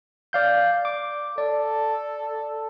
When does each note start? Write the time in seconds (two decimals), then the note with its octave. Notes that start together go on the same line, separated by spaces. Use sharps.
0.33 D5 F5 G6
0.85 D6
1.38 A4 D5